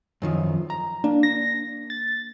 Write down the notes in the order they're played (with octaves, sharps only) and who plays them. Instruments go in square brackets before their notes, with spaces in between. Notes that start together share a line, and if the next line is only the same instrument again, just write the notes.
[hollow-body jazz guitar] F#2 D#3 F3
A#5
[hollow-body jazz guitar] A#3 [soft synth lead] D4
[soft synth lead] A#6
A6